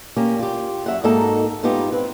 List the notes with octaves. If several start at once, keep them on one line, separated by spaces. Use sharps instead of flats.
A#3 C#4 G4
F4 G4
F#2 E5 F#5
G#2 A#3 D#4 F#4 A4 A#5
G#2 B3 D#4 F4 G4
C4 B4